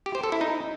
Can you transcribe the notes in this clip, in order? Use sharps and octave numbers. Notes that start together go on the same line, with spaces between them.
G4
C5
A4
E4
D#4